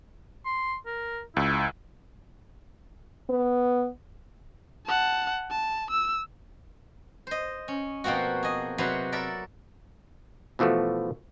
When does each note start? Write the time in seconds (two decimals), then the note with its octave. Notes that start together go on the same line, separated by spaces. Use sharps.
0.45 C6
0.86 A#4
1.37 C#2 E4
3.29 B3
4.86 F#5 A5
5.51 A5
5.90 E6
7.27 C5 D#5
7.68 C#4
8.04 B2 F3 A#3 C4 F#4
8.43 G#4 D#5
8.78 C3 F#3 F#4 B4 C5
9.12 A4 A#4 D5 E5 B5
10.59 B2 E3 F3 A3 F#4